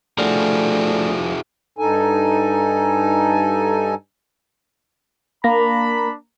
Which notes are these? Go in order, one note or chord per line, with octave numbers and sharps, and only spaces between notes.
F3 A3 D4 E4 F#4 G#4
G2 D#4 A4 G#5
A#3 D4 A#5 B5